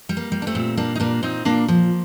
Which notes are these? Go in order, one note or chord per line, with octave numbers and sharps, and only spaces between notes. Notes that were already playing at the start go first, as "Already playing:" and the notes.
G3
A#3
G3
D4
A3 C4
A#2
G3 A#3 D4
D#4
A#2 A#3 D4
A#2 C4 D#4
A#2 A#3 D4
F3 A#3